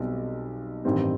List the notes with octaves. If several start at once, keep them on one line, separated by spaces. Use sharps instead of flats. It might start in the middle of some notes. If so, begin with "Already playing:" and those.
Already playing: B1 B2 G3 C4
A1 G2 D#3 G3 C4